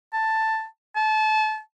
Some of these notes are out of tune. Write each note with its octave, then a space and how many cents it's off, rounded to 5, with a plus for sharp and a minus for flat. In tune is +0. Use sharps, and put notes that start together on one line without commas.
A5 +10
A5 -30